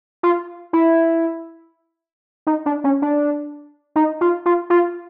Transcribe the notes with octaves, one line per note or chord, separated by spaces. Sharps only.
F4
E4
D#4
D4
C#4
D4
D#4
F4
F4
F4